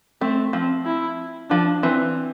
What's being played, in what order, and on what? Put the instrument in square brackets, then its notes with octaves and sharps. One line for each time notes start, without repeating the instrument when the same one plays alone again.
[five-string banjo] A3 [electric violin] C4
[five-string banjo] F3 [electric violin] C4
[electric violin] E4
[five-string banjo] F3 [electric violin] D4
[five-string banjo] E3 [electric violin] C4